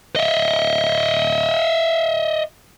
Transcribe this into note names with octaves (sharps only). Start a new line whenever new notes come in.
D#5 E5